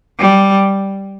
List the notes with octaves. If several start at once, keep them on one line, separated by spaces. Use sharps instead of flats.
G3